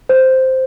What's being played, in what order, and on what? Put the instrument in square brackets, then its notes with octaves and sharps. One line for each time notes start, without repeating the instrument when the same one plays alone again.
[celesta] C5